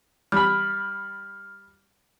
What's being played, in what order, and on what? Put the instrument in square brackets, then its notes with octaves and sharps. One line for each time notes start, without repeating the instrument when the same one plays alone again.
[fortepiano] G3 B5 [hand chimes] F6